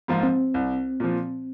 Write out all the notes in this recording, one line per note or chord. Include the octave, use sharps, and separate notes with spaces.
G#2 F3 A#3 F4
C4
C2
A#2 F3